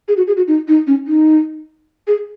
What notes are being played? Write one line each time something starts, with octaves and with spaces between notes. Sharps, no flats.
G#4
F#4
G#4
F#4
D#4
D#4
C#4
D#4
G#4